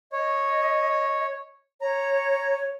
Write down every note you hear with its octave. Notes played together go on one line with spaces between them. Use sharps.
C#5 D#5
C#5 A#5